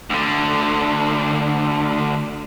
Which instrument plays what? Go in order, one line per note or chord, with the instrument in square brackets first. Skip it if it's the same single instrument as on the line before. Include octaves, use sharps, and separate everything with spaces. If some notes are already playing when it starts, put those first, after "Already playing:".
[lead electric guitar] D2 D3